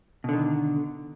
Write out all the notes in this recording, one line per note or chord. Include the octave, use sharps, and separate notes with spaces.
B2 D3 D#3